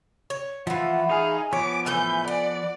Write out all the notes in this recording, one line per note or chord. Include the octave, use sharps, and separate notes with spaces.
C#5
E3 F3 A3 F4 F#5
D#4 G#4 F5 G#5
F3 B3 C#5 C#6 D6
A2 E3 B4 G6
D5 F#5